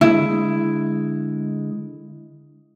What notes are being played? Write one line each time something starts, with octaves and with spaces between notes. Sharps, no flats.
D3 G#3 E4